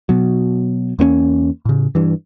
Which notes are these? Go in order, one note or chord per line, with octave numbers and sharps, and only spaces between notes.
B2 F#3
E2 A#3 C4 C#4
A2 C#3
G2 E3